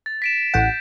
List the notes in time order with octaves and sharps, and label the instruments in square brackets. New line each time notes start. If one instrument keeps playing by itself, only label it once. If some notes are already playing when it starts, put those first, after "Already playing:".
[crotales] A6
B6 D7 E7
[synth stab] A1 F#5 [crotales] G6